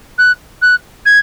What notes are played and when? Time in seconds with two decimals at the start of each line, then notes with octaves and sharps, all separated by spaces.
0.18 F#6
0.62 F#6
1.05 G#6